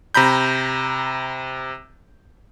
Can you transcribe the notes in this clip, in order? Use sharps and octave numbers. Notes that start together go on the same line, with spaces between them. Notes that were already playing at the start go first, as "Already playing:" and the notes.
C3 A#5 B5 G6